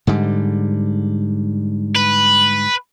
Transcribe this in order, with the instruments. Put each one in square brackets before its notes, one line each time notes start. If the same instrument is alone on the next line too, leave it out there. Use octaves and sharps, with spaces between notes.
[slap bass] G#2 D3 G3
[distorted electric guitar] B4